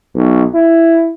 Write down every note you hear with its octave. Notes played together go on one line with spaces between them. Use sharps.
B1
E4